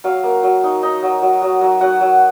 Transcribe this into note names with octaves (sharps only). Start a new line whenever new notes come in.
F#3 F5
A#3
F#3
D#4
D#4
F#3
F#3
F#3
F#3
F#3 F#5
F#3